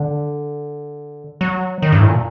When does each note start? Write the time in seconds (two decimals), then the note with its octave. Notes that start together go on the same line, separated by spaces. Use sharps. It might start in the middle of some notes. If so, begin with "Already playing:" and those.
Already playing: D3
1.41 F#3
1.82 D#3
1.92 G2
2.00 A2
2.08 A#2